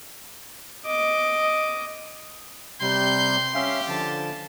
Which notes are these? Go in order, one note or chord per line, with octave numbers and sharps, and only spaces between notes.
D#5 D6
C3 G3 C6 G6
C#4 G4 E5 F5
D3 F3 A5